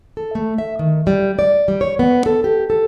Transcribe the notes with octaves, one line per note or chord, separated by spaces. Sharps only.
A4
A3
E5
D#3
G3
D5
G3
C#5
B3
A4
G4
A4